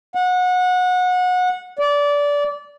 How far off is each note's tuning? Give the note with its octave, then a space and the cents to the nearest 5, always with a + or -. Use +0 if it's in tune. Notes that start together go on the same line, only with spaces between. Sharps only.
F#5 -25
D5 -20